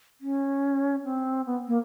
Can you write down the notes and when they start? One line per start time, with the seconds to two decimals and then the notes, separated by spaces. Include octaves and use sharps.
0.21 C#4
1.04 C4
1.46 B3
1.68 A#3